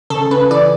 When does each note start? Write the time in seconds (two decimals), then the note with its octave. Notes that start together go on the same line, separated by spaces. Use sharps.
0.10 C#3 A4
0.31 C#3 B4
0.51 E3 D5